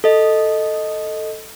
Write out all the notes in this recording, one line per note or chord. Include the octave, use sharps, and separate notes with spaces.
A4 D#5